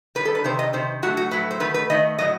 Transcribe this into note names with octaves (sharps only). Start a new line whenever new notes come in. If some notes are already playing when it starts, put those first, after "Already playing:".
D#3 G3 B4
A4
B4
C3 D#3 C5
D#5
C3 D#3 C5
A2 F#3 A3 F#4
F#4
A2 F#3 A3 B4
C5
D#3 A3 B4
B4
D#3 A3 D#5
A2 F#3 D#5